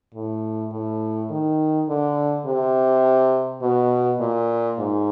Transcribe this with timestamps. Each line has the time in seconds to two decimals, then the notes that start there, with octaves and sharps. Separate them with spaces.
0.14 A2
0.72 A2
1.30 D#3
1.88 D3
2.46 C3
3.62 B2
4.20 A#2
4.78 G#2